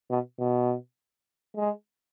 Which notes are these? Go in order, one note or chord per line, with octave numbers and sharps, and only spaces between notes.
B2
B2
G#3